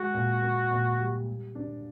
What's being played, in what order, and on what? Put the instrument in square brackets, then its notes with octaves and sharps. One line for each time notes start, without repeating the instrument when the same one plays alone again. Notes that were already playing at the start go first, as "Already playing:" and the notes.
Already playing: [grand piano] G#3 [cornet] F#4
[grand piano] A#2
A#3
A#2
G3
G3
D4